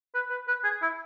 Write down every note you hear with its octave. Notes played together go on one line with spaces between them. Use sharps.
B4
B4
B4
G#4
E4